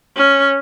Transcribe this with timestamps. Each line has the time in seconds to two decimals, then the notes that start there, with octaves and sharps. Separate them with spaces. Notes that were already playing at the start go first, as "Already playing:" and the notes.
0.16 C#4